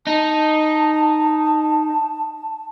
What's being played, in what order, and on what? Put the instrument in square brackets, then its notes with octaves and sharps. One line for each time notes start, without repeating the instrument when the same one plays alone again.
[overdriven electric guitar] D#4 [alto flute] A5